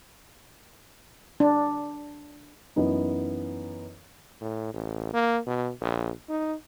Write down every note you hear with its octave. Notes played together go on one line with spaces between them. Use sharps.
D4
F#2 E3 B3 D#4
A2
A1
A#3
B2
A#1
D#4